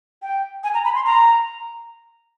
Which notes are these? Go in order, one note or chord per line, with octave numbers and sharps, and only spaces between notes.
G5
G#5
A#5
B5
C6
A#5